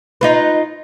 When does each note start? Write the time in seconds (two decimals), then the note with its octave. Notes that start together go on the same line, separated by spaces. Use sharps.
0.21 D#4 F4 B4